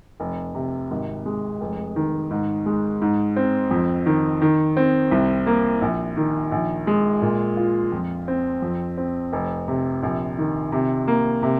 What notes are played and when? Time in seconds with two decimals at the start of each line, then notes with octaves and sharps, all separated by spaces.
0.20 F1
0.55 C3
0.91 G#1
1.26 G#3
1.61 F1
1.96 D#3
2.31 G#2
2.66 G#3
3.02 G#2
3.36 C4
3.71 F2
4.06 D#3
4.42 D#3
4.77 C4
5.11 C2
5.47 A#3
5.82 A#1
6.17 D#3
6.52 A#1
6.87 G#3
7.22 A#2
7.57 F4
7.92 F2
8.28 C4
8.62 F2
8.97 C4
9.33 F1
9.68 C3
10.03 A#1
10.38 D#3
10.72 C3
11.08 A#3
11.43 C3